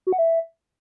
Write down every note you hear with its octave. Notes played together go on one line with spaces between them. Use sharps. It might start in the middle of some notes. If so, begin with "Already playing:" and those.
F#4
F#5
E5